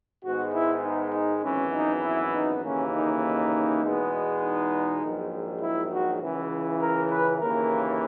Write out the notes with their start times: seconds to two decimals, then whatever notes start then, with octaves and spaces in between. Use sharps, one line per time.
0.24 G#2 D#3 G#3 B3 F#4
0.54 E4
0.84 D#4
1.14 D#4
1.44 G#1 F#2 E3 B3 C#4
1.73 D#4
2.03 E4
2.33 D#4
2.63 D#2 C#3 E3 A#3 C#4
2.93 D#4
3.22 D#4
3.82 E2 B2 G#3 B3
4.42 D#4
5.02 A#1 G#2 D#3 F#3
5.62 E4
5.91 F#4
6.21 C#2 C#3 E3
6.81 A#4
7.10 B4
7.40 D#2 C#3 E3 A#3 A#4